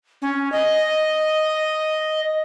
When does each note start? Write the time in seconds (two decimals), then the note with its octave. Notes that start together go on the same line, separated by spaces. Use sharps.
0.22 C#4
0.52 D#5